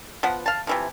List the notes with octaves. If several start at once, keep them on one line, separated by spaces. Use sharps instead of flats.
F3 B3 F#5
F5 A5
C3 E3 F3